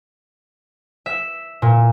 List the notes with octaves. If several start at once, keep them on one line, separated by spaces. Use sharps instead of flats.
E5
A#2